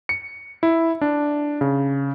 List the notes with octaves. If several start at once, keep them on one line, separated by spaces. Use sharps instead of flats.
C#7
E4
D4
C#3